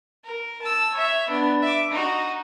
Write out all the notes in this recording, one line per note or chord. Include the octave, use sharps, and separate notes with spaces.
A#4
A5 E6
C#5 E5
B3 D4
E5 D6
D#4 F#4